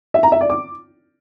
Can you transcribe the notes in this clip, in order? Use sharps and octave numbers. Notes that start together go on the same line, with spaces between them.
E5
A#5
E5
D5
D6